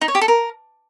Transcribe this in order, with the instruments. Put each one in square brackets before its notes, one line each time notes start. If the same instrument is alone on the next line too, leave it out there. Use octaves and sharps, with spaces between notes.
[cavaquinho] D#4
C#5
G4
A4
A#4